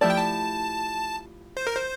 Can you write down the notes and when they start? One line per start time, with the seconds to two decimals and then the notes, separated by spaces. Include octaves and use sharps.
0.01 F3 A3 E4 G4 D5 A5
0.10 G5
0.18 A5
1.57 C5
1.67 A#4
1.76 C5